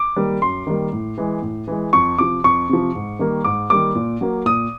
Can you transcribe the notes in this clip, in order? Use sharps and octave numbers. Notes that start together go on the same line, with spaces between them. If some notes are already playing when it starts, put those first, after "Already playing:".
Already playing: D6
D#3 G3 A#3
F#2 C6
D#3 G3 A#3
A2
E3 G#3
A2
E3 G#3
F2 C#6
C3 F3 D6
F2 C#6
C3 F3
G#2
D#3 G3 A#3
G#2 D6
D#3 G3 A#3 D6
A#2
F#3 A#3
A#2 D#6